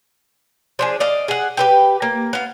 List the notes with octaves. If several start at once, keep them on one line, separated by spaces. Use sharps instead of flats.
F3 D4 G#4
D5 D#5 F5
G#4 F#5
G4 B4 G5
A#3
B3 F5